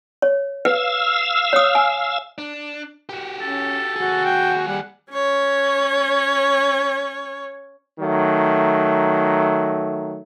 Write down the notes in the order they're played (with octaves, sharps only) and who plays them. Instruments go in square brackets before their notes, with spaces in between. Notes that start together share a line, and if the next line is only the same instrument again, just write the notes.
[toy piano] C#5
[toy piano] B4 [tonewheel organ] F5 E6
[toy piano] C#5 D#6
G#5
[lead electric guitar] D4
F#4 G4
[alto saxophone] C#4 [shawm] A4
[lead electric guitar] D#2 G#4 [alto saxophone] F#4
[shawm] G5
[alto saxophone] G3 [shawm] F#5
[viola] C#4 C#5
[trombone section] D#3 F#3 A3